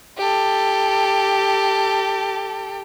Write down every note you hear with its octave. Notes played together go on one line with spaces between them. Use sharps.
G4 A4